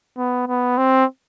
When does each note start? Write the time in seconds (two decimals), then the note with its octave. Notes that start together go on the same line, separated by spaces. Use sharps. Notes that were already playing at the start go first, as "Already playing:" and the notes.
0.17 B3
0.48 B3
0.78 C4